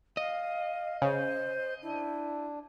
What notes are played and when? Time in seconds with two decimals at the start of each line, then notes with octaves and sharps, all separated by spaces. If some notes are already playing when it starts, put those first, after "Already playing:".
0.17 D#5 F5
1.02 C#3 C5
1.83 D4 E4